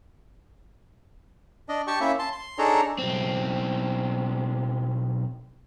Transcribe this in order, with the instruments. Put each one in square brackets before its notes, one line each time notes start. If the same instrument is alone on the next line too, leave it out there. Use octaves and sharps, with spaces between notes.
[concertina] D4 D#5
G4 G5 A5 C#6
A#3 C#4 E4 E5
A5 C6
C6
D4 D#4 G#4 A4 C#5 A#5
[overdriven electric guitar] B1 C4